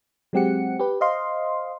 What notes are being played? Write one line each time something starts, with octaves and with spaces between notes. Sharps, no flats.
F#3 G#3 C4 G4 F#5 C#7
G4 B4
C5 D#5 F5 C6